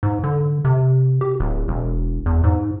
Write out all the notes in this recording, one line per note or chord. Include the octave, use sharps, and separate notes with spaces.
G#2
D3
C3
G4
D1
E1
E2
G#2